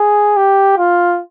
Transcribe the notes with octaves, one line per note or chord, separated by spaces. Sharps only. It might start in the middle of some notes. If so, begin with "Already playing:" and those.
Already playing: G#4
G4
F4